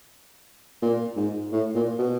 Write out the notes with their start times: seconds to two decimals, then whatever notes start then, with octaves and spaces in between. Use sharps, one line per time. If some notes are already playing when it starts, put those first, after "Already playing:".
0.82 A#2
1.16 G#2
1.53 A2
1.75 A#2
1.99 B2